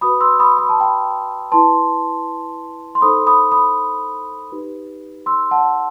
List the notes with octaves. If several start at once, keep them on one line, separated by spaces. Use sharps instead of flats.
F#4 B4 B5 D#6
C6 E6
B5 D#6
B5
A5
G5 B5
E4 B4 A5 C6
C6
D#4 A4 C5 B5 D#6
B5 D#6
B5 D#6
D#4 G4 B4
C6 E6
F#5 A5